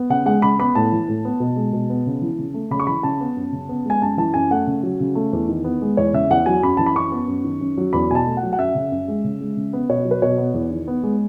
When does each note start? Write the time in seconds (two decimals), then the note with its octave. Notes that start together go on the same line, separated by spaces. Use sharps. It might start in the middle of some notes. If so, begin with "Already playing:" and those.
Already playing: B3
0.10 C#3 F#5
0.26 G#3 F#5
0.42 C#3 B5
0.59 B3 B5
0.75 A2 A5
0.92 E3
1.09 A2
1.25 B3
1.40 B2
1.56 G#3
1.73 B2
1.90 B3
2.06 C#3
2.22 E3
2.39 C#3
2.54 A3
2.71 C#3 B5
2.80 C#6
2.87 E3 B5
3.03 C#3 A5
3.20 B3
3.37 F#2
3.53 C#3
3.69 B3
3.86 G#3 G#5
4.01 F#2 A5
4.17 E3 A5
4.34 F#2 G#5
4.51 A3 F#5
4.67 C#3
4.83 F#3
5.00 C#3
5.15 A3
5.33 E2
5.48 D#3
5.64 B3
5.82 G#3
5.97 E2 C#5
6.14 C#3 E5
6.30 E2 F#5
6.46 F#3 G#5
6.63 F#2 B5
6.77 E3 A5
6.86 B5
6.95 F#2 C#6
7.12 B3
7.28 F#2
7.44 D#3
7.61 F#2
7.77 F#3
7.93 E2 B5
8.10 B2 G#5
8.15 A5
8.26 A3
8.37 F#5
8.43 F#3
8.53 F#5
8.58 F#2 E5
8.75 C#3
8.92 F#2
9.08 G#3
9.24 C#3
9.41 G#3
9.57 C#3
9.73 B3
9.89 B2 C#5
10.05 F#3
10.11 B4
10.22 B2 C#5
10.38 B3
10.54 E2
10.71 D#3
10.88 B3
11.03 G#3